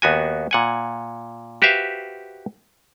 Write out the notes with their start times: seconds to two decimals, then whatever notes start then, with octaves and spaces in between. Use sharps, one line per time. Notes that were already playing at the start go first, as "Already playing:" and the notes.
0.02 D#2 B3 F#4 G#5
0.51 A#2 F#5 G#5
1.62 F#4 G4 B4 C5 E5 F5